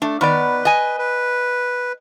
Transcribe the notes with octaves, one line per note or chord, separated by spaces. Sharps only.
A3 D4
D#3 B3 B4 D5
D#5 G#5
B4